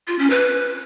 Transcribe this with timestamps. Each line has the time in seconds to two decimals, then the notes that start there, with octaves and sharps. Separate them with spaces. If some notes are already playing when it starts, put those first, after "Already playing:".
0.08 F4
0.19 C#4
0.30 B4